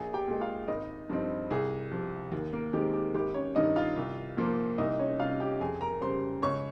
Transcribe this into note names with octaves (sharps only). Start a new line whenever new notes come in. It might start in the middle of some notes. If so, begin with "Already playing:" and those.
Already playing: A#1 G#4 G#5
G4 G5
A#2 G#3
F4 F5
G#1 D#4 D#5
G2 F3 C4 D#4
C2 G#4
C3 F3
D#2
A#3 A#4
D#3 G#3 C4 G4
G4
G#1 G4
C#4 C#5
G2 D#3 D#4 D#5
F4 F5
C2
A#2 F3 A#3
C2 D#4 D#5
C#4 C#5
C3 G3 C#4 F4 F5
G4 G5
F2 G#4 G#5
A#4 A#5
C#3 G3 C5 C6
C#2 C#5 C#6